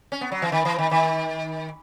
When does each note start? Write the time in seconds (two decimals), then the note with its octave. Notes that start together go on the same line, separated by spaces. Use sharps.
0.12 C#4
0.21 B3
0.32 F#3
0.42 E3
0.52 D#3
0.65 E3
0.78 D#3
0.91 D#3